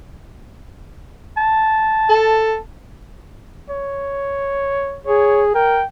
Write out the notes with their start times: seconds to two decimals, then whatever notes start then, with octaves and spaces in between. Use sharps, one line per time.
1.37 A5
2.09 A4
3.70 C#5
5.06 G#4 C#5
5.55 A#4 G5